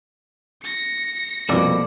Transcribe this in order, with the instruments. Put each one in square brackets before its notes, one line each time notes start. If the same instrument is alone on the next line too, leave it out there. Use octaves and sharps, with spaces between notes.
[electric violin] A#6 C#7
[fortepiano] C2 F2 B2 [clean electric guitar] A#3 A4 D5